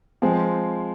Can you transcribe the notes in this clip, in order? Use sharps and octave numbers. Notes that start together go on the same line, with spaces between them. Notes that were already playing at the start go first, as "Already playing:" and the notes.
F3 G#3 C4